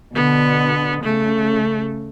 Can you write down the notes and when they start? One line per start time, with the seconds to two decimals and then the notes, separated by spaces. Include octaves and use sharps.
0.15 B2 D3 B3
1.02 C#3 A3